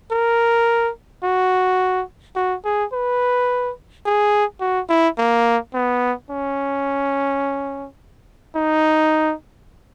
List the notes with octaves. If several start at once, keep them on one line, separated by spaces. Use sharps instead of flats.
A#4
F#4
F#4
G#4
B4
G#4
F#4
E4
A#3
B3
C#4
D#4